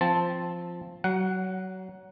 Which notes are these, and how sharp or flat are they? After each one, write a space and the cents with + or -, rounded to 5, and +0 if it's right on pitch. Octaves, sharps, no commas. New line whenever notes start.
F3 -5 C4 +0 A5 +0
F#3 +25 F#5 +0